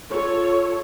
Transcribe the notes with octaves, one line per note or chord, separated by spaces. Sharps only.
F4 A4 C#5